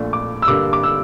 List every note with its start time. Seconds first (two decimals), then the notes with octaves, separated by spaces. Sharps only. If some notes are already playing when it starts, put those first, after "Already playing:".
Already playing: A#1 A#2 A3 D4
0.13 D6
0.42 E6
0.48 G2 D3 G3 A#3 D6
0.73 D6
0.83 E6